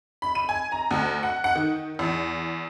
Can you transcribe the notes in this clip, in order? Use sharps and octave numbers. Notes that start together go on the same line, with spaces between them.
B5
D#7
G#5
A#5
D2
F#5
F#5
D#3
E2